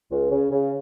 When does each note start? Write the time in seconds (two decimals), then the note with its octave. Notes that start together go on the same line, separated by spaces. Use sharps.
0.11 C#2
0.31 C#3
0.52 C#3